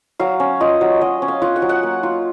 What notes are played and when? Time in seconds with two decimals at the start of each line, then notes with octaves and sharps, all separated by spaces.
0.20 F#3 F5
0.40 C#4
0.60 F4 D#5
0.81 F#3
1.01 F#3 D#5
1.22 C#4
1.28 F5
1.42 F4 F#5
1.56 F#5
1.62 F#3
1.69 F#5
1.83 A#3
2.03 F4